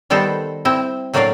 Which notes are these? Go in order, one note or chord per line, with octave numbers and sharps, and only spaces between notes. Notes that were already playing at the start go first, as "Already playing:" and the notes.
D#3 G3 B3 A4 C5
C4 E4
A2 F#3 A#3 D4 D5 F5